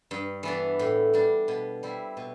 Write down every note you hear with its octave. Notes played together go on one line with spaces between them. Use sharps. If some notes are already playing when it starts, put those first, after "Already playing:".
G2
E3 B3 D4
A2
G3 D4
B2
G3 C4 E4
B2